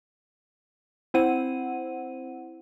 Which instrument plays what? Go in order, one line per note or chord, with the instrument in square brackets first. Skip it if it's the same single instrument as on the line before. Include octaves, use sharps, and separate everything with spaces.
[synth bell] C4 E4 C5 F#5 D#7